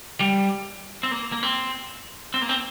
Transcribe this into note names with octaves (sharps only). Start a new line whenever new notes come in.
G3
C4
A#3
A#3
C4
C4
A#3
C4